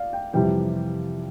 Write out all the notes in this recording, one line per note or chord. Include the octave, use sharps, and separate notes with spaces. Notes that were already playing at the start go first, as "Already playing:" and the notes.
Already playing: D5 F5
G5
F2 C3 E3 G3 G5